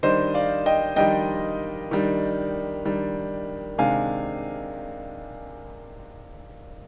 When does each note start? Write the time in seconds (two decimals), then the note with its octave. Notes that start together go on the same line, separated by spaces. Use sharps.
0.03 D#3 G3 D4 C5 D#5
0.34 D5 F5
0.66 D#5 G5
0.96 D#3 G3 D4 D#5 G5
1.91 D#3 G3 D4
2.85 D#3 G3 D4
3.78 C3 D#3 G#3 D4 F5 G#5